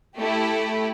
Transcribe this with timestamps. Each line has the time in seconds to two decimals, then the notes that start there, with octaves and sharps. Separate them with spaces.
0.18 A3 E4 G4